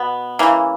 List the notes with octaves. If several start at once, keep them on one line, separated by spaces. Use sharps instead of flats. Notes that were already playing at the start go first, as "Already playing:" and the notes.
Already playing: B2 B3
C#3 E3 A#3